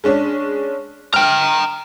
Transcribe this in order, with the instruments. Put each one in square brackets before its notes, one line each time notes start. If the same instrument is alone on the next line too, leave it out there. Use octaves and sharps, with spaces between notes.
[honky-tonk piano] G#3 C#4 D4
[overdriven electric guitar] G5 A#5 [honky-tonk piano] F6